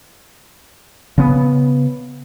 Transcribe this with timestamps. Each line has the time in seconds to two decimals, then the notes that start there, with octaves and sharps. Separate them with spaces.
1.18 C#3 B3